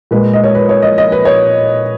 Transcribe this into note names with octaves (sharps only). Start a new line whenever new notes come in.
A#2 G#3 B4
D#5
C#5
B4
C#5
D#5
D#5
B4
C#5